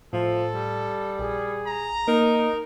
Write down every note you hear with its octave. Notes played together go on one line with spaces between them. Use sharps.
A2 F3 A4
G3
A#1 G#4
A#5
A#3 D#4 A#4